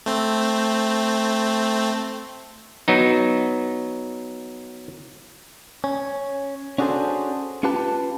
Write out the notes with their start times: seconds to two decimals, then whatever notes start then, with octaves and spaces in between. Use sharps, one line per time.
0.06 A3 C4
2.88 F#3 B3 D#4
5.84 C#4
6.78 C#4 D4 F#4 G#4 A4 C5
7.63 C#4 F4 G4 B4 A5